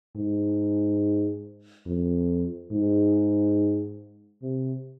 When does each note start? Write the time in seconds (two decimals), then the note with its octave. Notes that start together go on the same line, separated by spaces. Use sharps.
0.16 G#2
1.86 F2
2.71 G#2
4.42 C3